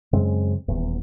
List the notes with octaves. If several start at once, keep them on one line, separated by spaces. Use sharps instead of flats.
F#2 C#3 G#3 C4
D#1 E2